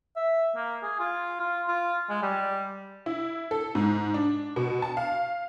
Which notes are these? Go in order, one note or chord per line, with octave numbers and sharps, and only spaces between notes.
E5
A#3
G#4
F4
F4
F4
G#3
G3
E4
A4
G#2
D4
B2
A5
F5